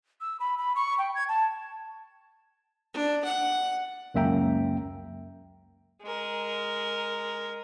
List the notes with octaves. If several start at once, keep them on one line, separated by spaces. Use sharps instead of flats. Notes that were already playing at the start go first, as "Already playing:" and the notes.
E6
B5
B5
C#6
G5
G#6
A5
D4
F#5
C#2 F#2 A#3 E5 G5 A#5
G#3 A#4